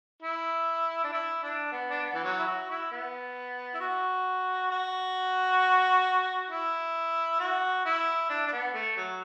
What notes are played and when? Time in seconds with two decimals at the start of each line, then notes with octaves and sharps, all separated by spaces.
0.22 E4
1.04 D4
1.13 E4
1.43 D4
1.72 B3
1.90 D4
2.02 B3
2.15 E3
2.24 F#3
2.39 E4
2.47 F#4
2.70 E4
2.91 B3
3.75 E4
3.81 F#4
4.71 F#4
6.50 E4
7.40 F#4
7.85 E4
8.29 D4
8.46 D4
8.52 B3
8.74 A3
8.97 F#3